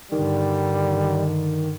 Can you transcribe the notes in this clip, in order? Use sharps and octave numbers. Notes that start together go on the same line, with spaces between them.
G2 D3 D#3 G3